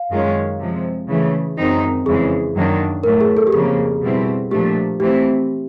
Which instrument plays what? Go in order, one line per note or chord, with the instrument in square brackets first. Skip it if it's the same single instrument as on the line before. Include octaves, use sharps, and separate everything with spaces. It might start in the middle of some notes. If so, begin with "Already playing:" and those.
Already playing: [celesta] F5
[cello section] F#2 D#3 G#3 C#4 F4
C3 F3 G#3
C#3 E3 A3
F#2 D#3 G#3 C4 D#4
[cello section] F2 C#3 E3 G#3 [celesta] G#4
[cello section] F#2 D#3 F#3 A#3 D4
[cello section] A2 F#3 A3 [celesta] A#4
[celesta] G#4
A4
G4
[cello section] F2 C#3 F3 A#3 [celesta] G#4
[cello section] B2 G3 C4 E4
[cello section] A#2 F3 A3 D4 [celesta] G4
[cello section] E3 A3 C4 E4 [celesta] G4